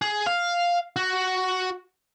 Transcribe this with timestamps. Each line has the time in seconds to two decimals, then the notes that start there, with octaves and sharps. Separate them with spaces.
0.02 G#4
0.27 F5
0.96 F#4